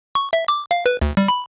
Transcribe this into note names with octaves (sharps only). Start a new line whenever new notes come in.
C#6
E5
D6
F5
B4
D2
G3
B5